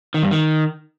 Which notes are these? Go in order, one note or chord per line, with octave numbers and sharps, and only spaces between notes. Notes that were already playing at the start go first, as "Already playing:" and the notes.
D#3
G2
D#3